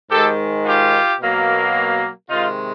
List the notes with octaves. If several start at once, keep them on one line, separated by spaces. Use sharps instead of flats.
G#2 D#3 G#3 G4 A4
F4 G4
B2 F#3 A#3
C3 D#3 G#3 D#4 F4